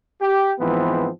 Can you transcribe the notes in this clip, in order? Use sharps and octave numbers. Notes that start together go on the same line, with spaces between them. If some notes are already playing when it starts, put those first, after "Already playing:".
G4
G#2 E3 F3 B3 C4